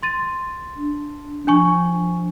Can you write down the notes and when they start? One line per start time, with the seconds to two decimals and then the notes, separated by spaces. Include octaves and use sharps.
0.03 C6 A6 D#7
0.76 D4
1.47 F3 D4 G#5 C#6